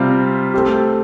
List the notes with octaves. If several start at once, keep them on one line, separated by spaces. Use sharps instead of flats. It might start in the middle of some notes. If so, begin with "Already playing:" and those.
Already playing: C3 G3 C4 F4
A3 C4 G4